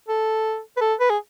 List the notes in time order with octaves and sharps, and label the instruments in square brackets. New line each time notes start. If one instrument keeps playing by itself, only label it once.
[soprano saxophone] A4
B4
A4
B4
G#4